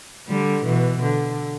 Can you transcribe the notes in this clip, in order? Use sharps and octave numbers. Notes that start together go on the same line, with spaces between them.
D3 G3
B2 E3
D3